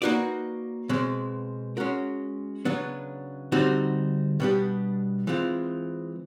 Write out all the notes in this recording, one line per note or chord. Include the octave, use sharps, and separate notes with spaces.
A#3 D#4 F#4 B4 D5
B2 G#3 C4
G#3 C#4 F#4 A#4
C#3 F#3 B3 D4
D3 G3 C4 D#4 F#4
B2 G3 B3 D4 G4
E3 G#3 C4 F4